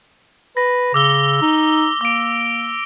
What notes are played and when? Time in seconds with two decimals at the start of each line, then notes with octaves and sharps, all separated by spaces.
0.57 B4 A#6
0.94 C#3 D6 E6 G7
1.42 D#4
2.01 A#3 D6 D7